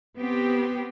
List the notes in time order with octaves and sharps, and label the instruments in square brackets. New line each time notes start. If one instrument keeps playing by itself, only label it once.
[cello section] B3 C4 G4